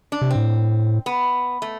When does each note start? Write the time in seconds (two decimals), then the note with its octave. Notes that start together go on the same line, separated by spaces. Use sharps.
0.12 D4
0.21 C3
0.31 C4
0.36 A2
1.06 B3
1.62 A3